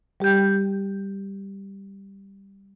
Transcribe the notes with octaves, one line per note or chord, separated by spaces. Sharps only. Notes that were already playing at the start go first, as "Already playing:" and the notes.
G3 G4 G5 G6